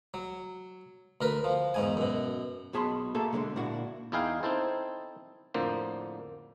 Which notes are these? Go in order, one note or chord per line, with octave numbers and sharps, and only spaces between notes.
F#3
D2 A#4 B4
F3
E2 G#2 G#5
F#2 B2
B1 B2 G#4 A5 B5 C6
A#3 G#4 A4 E5 A5
B2 D3 F3 G#3
A#2 A#3 D4 E4 F#4
E2 D#4 E4 G#4 F5 G5
C4 D#4 E4 A4 C5
F2 A2 D3 A#3 C5